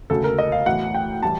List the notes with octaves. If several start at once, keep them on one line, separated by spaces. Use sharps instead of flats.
E1 D2 C#3 A4
A#4
D#5
F5
B1 A2 E3 F#5
G5
A2 E3 G3 A5